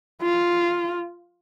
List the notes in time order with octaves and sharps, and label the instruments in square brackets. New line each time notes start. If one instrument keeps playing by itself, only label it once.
[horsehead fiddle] F4